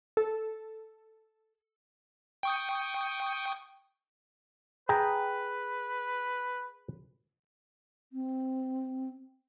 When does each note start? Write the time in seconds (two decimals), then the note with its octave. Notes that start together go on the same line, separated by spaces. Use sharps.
0.17 A4
2.43 G5 C#6 D#6
4.89 G#4 B4 G5 A#5
8.13 C4